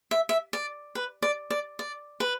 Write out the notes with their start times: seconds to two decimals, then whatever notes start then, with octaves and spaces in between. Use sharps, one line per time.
0.11 E5
0.29 E5
0.53 D5
0.95 B4
1.22 D5
1.50 D5
1.79 D5
2.20 B4